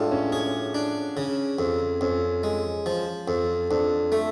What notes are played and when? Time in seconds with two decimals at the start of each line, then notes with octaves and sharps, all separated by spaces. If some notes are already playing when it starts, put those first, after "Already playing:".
Already playing: A2 G#3 D4 F4 F#4
0.12 C#4
0.32 C#4 G#4
0.75 D4
1.17 C#3
1.59 F2
2.01 F2 C#4
2.44 G#3
2.86 F3
3.28 F2
3.71 F2 D4
4.12 A3